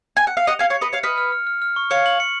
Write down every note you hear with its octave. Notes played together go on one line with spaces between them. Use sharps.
G#5 F#6
F#5 C#7
F5
D#5 F#5 F7
F5 G#5 C#7
C#5 F5
C#7
B4 D#5
C#5 F5 C#7
B4 D#5 F6
F6
F6
F6
F6
C#6
C#5 F5 C#7
F#7
C#7